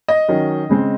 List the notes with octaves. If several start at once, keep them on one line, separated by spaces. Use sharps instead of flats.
D#5
D#3 F#3 C#4
C#3 G#3 C4